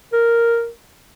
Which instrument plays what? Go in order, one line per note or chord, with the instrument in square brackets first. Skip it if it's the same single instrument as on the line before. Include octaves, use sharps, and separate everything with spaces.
[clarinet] A#4